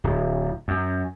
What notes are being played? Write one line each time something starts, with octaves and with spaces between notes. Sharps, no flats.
D1
F#2